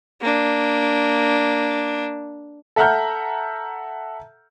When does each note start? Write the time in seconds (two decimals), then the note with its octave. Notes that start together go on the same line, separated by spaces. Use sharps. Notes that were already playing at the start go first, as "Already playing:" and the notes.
0.21 A#3 D4
2.76 A4 E5 F#5 A#5 F6 G6